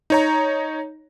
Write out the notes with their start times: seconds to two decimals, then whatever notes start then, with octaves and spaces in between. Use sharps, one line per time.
0.10 D#4 C#5 A#5